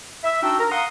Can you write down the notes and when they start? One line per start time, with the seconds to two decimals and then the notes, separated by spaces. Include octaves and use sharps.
0.24 E5
0.43 D4 D#4 F#4 G5 E6
0.59 A#4
0.72 F5 F#5 A#5 C6 D#6